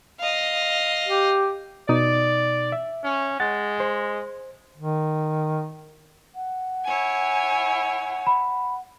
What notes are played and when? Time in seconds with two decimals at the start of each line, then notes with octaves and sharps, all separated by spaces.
0.20 D#5 F5
1.08 G4
1.89 B2 D#4 D5 D#6
2.72 E5
3.04 C#4
3.40 G#3 F#5 A6
3.80 C5
4.78 D#3
6.35 F#5
6.85 E4 C#5 G#5
8.27 B5